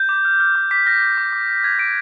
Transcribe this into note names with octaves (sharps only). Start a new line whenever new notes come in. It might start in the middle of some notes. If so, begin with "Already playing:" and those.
Already playing: G6
D6
F6
F6
D6
D6 B6
F6 A#6
F6
D6
D6
F#6
F#6 G#6
D6 D7